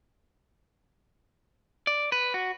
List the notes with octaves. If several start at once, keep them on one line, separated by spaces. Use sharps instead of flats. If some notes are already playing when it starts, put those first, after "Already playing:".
D5
B4
F#4